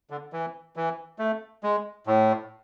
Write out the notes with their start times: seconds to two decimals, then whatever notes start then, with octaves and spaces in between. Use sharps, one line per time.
0.10 D3
0.33 E3
0.76 E3
1.19 A3
1.63 G#3
2.06 A2